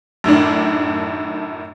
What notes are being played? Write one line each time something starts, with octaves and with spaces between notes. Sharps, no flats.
F#2 A2 D#3 D4